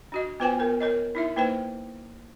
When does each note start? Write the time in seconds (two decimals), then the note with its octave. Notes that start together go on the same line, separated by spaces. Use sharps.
0.12 D4 F#4 D#5
0.40 B3 F4 B4 C5 G5 G#5
0.59 B3 A#4
0.80 A#4 C#5 D#5
1.15 D#4 E4 E5
1.36 A#3 D#4 B4 C5 G5